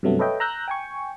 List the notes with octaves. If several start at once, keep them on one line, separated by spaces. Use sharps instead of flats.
G2 C3 F#3 A3 B3
A4 B4 C#5 D#5 E5 G5
A#5 E6 F#6 G6 A#6
G5 G#5 C#6